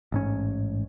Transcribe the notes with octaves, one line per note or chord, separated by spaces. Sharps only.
A1 G#2 C#4